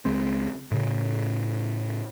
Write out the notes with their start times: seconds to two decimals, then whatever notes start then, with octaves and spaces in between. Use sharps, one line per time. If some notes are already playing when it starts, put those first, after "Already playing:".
0.05 C#2 G#3 C4
0.71 A2 C#3